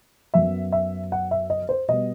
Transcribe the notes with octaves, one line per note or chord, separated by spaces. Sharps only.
F#2 F#3 B3 E5
E5
F#5
E5
D#5
C5
B2 G3 B3 D#5